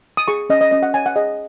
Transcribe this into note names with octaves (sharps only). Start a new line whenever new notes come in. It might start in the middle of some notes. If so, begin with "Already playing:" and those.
D#6
G#4 C#6
C#4 D#5
D#5
C#4 D#5
F#5
C#5 G#5
F#5
G#4 D#5